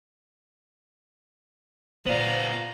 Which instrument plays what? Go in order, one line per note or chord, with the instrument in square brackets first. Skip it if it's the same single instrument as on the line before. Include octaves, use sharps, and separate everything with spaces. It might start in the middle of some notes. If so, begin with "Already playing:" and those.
[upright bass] A#2 [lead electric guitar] B3 F4 [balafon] C5 D5 [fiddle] F5 A#5